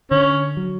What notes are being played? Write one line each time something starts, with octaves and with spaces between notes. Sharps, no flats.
D3 C#4
F#3